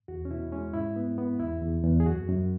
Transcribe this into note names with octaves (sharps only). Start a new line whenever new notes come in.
E2 F#4
C#4
B2 E4
G#3 C#4
G#2 E4
B3
B3
E2 E4
E2
E2
G#4
F#2 F#4
F#2